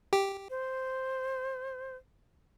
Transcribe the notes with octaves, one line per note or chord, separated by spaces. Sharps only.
G4
C5